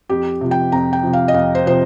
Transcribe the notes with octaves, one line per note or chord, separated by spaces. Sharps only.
F2 G4
C3 F3
G5
F2 A#5
G5
C3 F3
F5
D#5
F2 F5
C5
C3 F3 C5